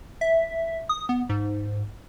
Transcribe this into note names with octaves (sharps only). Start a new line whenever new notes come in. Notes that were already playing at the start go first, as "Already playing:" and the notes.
E5
D#6
B3
G#2